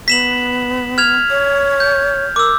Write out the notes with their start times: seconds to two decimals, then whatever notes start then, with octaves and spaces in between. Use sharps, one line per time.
0.08 B3 B6 E7 F#7
0.98 F6 G#6 F7
1.30 C#5
1.80 G6
2.36 A#4 D6 E6